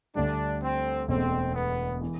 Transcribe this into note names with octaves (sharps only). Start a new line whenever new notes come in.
D2 D3 G3 D4
C4
E1 E2 B2 A3 C4
B3
E3